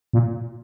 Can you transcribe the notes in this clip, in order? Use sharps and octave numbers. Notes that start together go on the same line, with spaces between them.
A#2